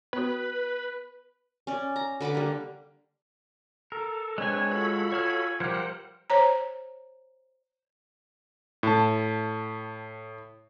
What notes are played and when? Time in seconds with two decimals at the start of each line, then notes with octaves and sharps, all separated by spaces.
0.13 B3 F#4 B4
1.67 C#4 D5
1.96 A#5
2.21 D3 B4 F#5 D6
2.35 G3 A#3
3.92 A4 A#4
4.38 G#3 C4 D4 B4 C#5 G#5
4.72 F4 F#4 A4 B5
5.12 C#5 G#5 E6 F6
5.60 F3 G3 G4 A#4 C5 F#5
6.30 C5 C#5 A#5
8.83 A2 A5